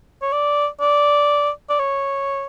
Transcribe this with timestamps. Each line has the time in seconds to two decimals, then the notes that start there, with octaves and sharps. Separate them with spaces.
0.22 C#5
0.32 D5
0.81 D5
1.69 D5
1.79 C#5